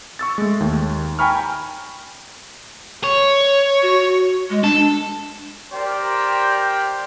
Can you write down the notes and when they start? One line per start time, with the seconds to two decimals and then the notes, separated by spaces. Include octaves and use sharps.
0.19 C#6 E6 A6
0.38 G#3 A3
0.60 D#2
1.19 G5 G#5 A#5 B5 C#6 F6
3.04 C#5
3.82 F#4
4.50 G#3
4.64 D4 A4
5.72 G4 A#4 C5 D5 G5